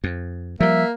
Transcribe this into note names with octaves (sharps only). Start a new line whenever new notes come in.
F2
F3 G3 A#3 E5